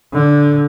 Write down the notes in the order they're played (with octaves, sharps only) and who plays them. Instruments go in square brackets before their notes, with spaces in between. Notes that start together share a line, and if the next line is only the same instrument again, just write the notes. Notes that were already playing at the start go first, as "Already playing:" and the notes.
[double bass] D3